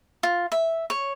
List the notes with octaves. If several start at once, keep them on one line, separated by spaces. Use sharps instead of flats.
F4
E5
C#5